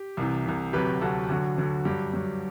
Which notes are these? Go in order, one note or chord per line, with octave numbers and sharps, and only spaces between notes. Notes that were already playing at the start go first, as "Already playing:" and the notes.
Already playing: G4
C2 C3 E3
C2 C3 E3
D2 C3 F#3 G4 B4
D2 C3 F#3 F#4 A4
D2 D3 F#3 F#4
D2 D3 F#3
G2 F#3 G4
G2 F#3